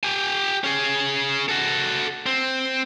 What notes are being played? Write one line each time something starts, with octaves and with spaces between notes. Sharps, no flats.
G4 G#5
C#4 G#4
F#4 A4
C4